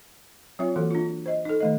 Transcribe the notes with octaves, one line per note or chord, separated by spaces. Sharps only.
F#3 C4 F4 C#5 E5
E3 A#3 F#4 A4
D4 F4
C5 D#5
D#4 A4
D#3 A3 D#5